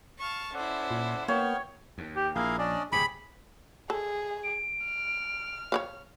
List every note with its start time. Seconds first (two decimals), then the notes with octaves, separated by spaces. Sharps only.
0.20 F5 A5 C#6
0.54 C#4 E4 A4 C5 D5 F#5
0.91 A#2
1.28 A#3 B3 C#5 G5 F6
1.98 D#2
2.16 G4
2.36 A#1 A#3 E4 G#4 F5
2.58 C#4 D4 D5 D#5
2.92 D1 G2 C3 G4 G#4 B5
3.90 G#4 A4
4.43 D7
4.85 F6
5.72 C#5 D5 F5